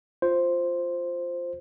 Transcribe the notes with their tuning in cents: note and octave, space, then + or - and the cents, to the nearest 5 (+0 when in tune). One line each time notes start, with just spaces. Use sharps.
F4 +0 C5 +0